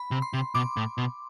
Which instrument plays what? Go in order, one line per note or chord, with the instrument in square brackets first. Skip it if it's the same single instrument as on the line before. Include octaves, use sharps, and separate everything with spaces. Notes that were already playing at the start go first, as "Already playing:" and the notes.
Already playing: [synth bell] B5
[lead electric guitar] C3
[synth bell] C6
[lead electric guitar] C3
[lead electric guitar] B2 [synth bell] D6
[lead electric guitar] A2
B2